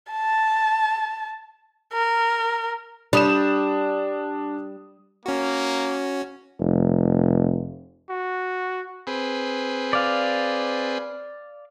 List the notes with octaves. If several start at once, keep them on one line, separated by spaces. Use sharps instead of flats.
A5
A#4
G3 D4 D#6 E7
A#3 C#4 F#4
F1
F#4
C4 G#4 B4
D5 F5